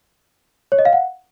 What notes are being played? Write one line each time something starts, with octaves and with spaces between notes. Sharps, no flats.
C#5
D#5
F5
F#5